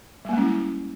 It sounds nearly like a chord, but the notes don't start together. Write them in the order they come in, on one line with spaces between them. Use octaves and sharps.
G3 A#3 G#3 C#4 E4